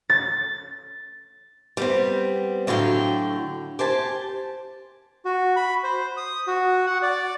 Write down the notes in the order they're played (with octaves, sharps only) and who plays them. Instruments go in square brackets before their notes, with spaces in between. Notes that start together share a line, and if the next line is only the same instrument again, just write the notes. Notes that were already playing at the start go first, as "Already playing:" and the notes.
[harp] A6
[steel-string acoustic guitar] G3 B3 C4
A2 D3 F#3 F5 G5
G4 C5 G#5 A5
[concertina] F#4
B5
C5
D#6
F#4
F#5
D5